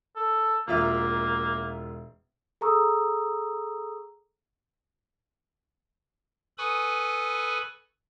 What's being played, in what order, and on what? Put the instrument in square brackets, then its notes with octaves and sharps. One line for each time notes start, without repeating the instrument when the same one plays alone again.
[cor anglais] A4
[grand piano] E1 F4 E5 [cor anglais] A#3
[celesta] G#4 A4 A#5 C#6 D#6 E6
[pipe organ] A4 B4 G#5 B5 C#6 D#6